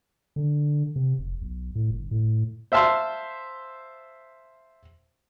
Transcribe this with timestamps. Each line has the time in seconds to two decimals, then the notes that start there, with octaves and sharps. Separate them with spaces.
0.36 D3
0.96 C3
1.19 F1
1.42 B1
1.75 A2
1.91 G1
2.11 A2
2.72 C5 E5 F5 A5 C6